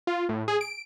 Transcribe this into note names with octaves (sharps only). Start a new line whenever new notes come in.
F4
A2
G#4
D7